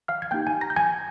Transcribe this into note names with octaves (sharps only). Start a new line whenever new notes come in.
F5 F6
G#6
A#3 D#4 G4 G5 G6
G#5 G#6
A#5 A#6
G6
G#5 G#6